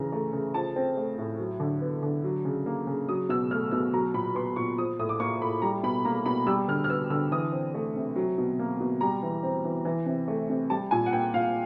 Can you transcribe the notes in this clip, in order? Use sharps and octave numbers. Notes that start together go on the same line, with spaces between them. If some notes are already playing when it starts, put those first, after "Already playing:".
Already playing: C#3 E3 A#5
A3
C#3
F3 A5
C4
A3
A2
F#3
D3
B3
D3
F#3
C#3
A#3
C#3
F#3 D#6
B2 E6
A3 F6
B2 E6
F#3 A#5
A#2 B5
B3 C6
A#2 C#6
F3 D#6
A2 D#6
D6
A#3 C#6
A2 B5
G3 A#5
B2 B5
A#3 A#5
B2 B5
G3 E6
D3 F6
F6
B3 E6
D3 E6
E3 D#6
C4
A3
C3
F#3
B2
A#3
B2
G3 A#5
E3
C4
E3
E3
C3
A3
C3
G3 A5
A#2 G#5
F#5
A#3 G5
A#2 F5